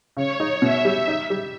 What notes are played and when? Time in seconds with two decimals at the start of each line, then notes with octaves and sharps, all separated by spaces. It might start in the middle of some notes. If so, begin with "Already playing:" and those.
0.16 C#3 C#5
0.40 D#4
0.62 B2 E5
0.85 G3
1.08 D#4
1.30 G3